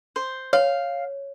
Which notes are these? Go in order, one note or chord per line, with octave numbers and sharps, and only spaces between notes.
C5
C#5 F5